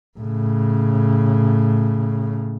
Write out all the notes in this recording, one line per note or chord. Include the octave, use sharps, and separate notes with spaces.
A2 C#3